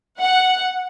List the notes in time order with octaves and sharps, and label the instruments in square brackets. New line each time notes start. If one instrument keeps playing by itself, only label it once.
[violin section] F#5